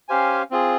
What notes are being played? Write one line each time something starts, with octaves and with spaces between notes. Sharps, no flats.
C#4 G4 C5 F5 G#5
C4 F4 G#4